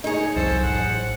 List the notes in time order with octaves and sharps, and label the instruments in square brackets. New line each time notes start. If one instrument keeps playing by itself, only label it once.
[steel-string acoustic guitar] D#4 G#4 [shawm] C#5
[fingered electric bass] C2 F2 F#3 [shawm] A4 [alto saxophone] C5
[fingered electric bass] A1 [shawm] F#5